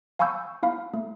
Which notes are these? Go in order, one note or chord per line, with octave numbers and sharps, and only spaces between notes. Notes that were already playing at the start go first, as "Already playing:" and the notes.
F5 G#5 B5 C#6 E6 G6
E4 F5 B5
A3